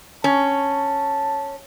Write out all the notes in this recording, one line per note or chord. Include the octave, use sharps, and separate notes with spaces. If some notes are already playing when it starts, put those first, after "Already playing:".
C#4 A5